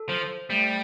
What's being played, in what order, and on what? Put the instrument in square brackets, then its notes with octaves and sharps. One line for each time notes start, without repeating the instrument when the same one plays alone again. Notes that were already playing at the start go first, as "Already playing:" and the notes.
Already playing: [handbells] A4
[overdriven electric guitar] F3 [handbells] C5
[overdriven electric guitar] G3 [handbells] A3